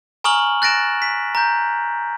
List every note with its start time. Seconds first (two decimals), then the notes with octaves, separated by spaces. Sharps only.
0.24 G#5 A#5 C#6 D#6 F6 F#7
0.62 F#6 A6 A#6 D7 E7
1.02 B6
1.35 A#5 G6